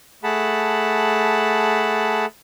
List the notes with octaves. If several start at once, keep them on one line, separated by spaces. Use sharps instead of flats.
A3 G#4 F#5 A5 B5